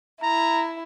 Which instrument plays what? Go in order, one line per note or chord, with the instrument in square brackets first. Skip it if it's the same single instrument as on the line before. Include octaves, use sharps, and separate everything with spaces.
[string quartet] E4 [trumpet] A#5